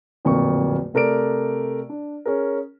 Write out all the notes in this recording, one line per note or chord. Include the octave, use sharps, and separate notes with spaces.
D1 F2 A#2 A#3 C#6
C3 A3 A#4 D5 D7
D4
C#4 G#4 A#4